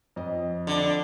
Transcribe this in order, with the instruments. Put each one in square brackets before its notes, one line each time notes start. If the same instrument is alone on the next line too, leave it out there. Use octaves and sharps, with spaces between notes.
[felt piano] F2 D#5
[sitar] D3 [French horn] D4